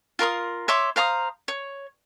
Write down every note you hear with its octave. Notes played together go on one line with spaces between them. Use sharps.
F4 A#4 C6 D#6
C#5 E5 C6 D6
C5 F5 A#5 D#6
C#5